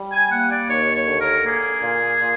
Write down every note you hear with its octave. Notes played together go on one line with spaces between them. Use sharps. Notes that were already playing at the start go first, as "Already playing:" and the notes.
Already playing: G3
G#5
A#3 F#5
D5
D#2 C#5
C#5
D3
A#4
A#3 G#4
A#2
A#2